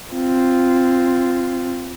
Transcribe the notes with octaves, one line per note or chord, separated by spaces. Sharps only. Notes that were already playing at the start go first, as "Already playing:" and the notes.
C4 F4